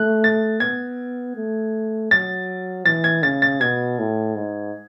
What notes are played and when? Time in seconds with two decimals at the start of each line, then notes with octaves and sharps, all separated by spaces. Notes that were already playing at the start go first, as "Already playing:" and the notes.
Already playing: A3 F#6
0.24 A6
0.60 B3 G#6
1.36 A3
2.11 F#3 A6
2.86 E3 A6
3.04 G#6
3.23 C#3 A6
3.42 A6
3.60 B2 G#6
3.99 A2
4.35 G#2